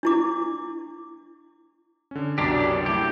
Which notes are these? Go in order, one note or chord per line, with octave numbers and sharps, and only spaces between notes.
D4 E4 D6
D3 C#4
C2 F#2 B2 D4 G4
A3 E4 G4